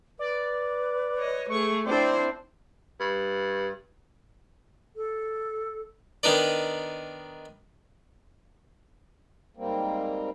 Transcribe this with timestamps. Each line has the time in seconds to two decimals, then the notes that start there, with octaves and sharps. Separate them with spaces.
0.19 B4 D5
1.16 C#5 D#5
1.49 A3 G#4 C#6
1.86 C4 D4 E4 C5 D5
3.00 G2
4.96 A4
6.23 D#3 B3 D4 D#4 B4 D5
9.57 G#2 G3 A#3 C4